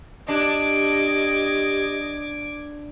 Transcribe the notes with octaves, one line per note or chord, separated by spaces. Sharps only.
D4 G4 D#5 D6 G#6